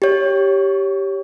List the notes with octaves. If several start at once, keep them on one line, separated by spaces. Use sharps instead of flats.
G4 C#5